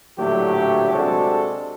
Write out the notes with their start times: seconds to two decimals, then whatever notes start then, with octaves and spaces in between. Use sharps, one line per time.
0.19 A#1 A2 D3 F#3 A3 G4
0.93 C3 G#3 D4 F#4 G#4 A4